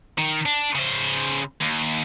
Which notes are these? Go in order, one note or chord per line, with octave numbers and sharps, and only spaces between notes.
D#3
D4
C#3 C5
D#2